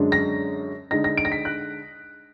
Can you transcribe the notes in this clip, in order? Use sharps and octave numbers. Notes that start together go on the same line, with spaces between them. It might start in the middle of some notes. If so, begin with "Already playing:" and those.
Already playing: F#2 D3 G#3 D4
A#6
D3 G#3 D#4 A#6
A#6
D7
A#6
B6
F#6